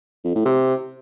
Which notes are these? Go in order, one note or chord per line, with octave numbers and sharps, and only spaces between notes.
F2
A2
C3